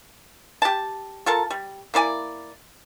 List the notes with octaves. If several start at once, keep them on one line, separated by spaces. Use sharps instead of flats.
G4 A5
F4 A4 A#4 A5
G3
A#3 E4 D5 G#5